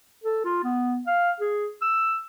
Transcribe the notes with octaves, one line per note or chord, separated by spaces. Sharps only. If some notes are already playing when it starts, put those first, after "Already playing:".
A4
F4
B3
F5
G#4
E6